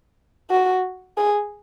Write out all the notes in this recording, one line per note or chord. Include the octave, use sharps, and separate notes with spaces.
F#4
G#4